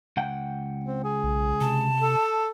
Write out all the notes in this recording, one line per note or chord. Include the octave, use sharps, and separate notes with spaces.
C#2 F#5 G5
C4
G#4
B1
C3 A5
A4